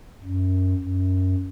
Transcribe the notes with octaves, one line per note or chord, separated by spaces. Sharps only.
F#2
F#2